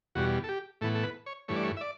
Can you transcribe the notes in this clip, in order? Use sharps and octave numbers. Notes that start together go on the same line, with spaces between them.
E2 B2 G3 F#4
A4
G4
A2 E3 B3 A4
A4
B4
C#5
G2 E3 A3 C#5
D5
C#5
E5
D5